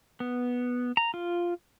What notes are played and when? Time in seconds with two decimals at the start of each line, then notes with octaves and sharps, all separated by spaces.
0.20 B3
0.97 A#5
1.14 F4